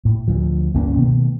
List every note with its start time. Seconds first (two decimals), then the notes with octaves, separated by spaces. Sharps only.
0.05 A2
0.28 D2 F3
0.74 C#2 G2 A#3 C#4
0.97 B2 D#3 A3 B3